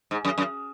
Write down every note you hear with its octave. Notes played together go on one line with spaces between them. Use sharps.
G#2
F#2
F#2